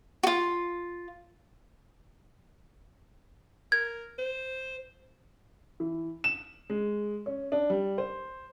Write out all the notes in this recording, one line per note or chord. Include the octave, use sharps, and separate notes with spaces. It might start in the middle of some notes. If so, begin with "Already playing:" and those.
F4 F#4
A#4 G#6
C5
E3
E7
G#3
C#4
D4
G3
C5